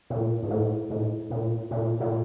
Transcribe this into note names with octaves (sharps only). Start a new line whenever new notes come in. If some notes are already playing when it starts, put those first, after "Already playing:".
A#2
G#2
A2
A2
A#2
A#2
A#2